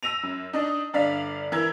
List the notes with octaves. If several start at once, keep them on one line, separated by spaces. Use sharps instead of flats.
E6 A#6 D#7 F7
F#2
D4 D#4
G1 D4 D5 F5 B6
E3 E4 A#4 G#6